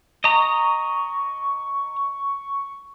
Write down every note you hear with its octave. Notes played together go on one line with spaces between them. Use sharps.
D#5 A#5 C#6